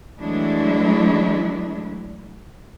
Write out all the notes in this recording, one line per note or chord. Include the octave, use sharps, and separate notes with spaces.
E3 F#3 G#3 A3 D4 E4